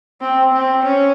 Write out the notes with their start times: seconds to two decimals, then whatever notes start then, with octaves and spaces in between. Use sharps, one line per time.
0.21 C4
0.53 C4
0.84 C#4